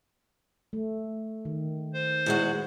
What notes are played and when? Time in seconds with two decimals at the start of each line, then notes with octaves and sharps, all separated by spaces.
0.73 A3
1.45 D#3
1.94 C5
2.26 E2 G#3 F#4